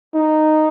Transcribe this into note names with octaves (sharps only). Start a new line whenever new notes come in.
D#4